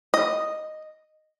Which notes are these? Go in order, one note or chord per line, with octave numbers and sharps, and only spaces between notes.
D#5